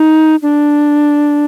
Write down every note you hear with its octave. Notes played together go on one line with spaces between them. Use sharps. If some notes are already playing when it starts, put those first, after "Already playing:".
Already playing: D#4
D4